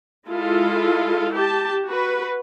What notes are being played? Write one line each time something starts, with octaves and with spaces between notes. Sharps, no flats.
G#3 E4 F4 A4
G4 A5
F#4 B4